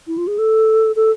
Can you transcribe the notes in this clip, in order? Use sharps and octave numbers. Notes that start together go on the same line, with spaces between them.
E4
F4
G#4
A4
A4